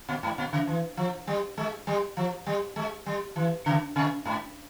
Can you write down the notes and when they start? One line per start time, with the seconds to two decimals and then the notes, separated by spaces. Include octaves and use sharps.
0.09 A#2
0.23 G#2
0.38 A#2
0.53 C#3
0.67 E3
0.97 F3
1.27 G3
1.57 G#3
1.87 G3
2.17 F3
2.46 G3
2.76 G#3
3.06 G3
3.36 E3
3.66 C#3
3.96 C3
4.25 G#2